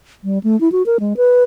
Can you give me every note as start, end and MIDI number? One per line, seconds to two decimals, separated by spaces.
0.24 0.39 55
0.44 0.59 57
0.61 0.71 64
0.72 0.83 66
0.86 0.97 70
1.00 1.13 56
1.17 1.43 71